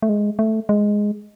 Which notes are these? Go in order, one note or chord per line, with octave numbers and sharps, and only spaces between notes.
A3
G#3
A3
G#3